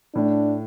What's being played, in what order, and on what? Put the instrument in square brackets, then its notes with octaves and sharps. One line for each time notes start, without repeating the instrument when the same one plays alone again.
[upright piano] A2 [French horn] D4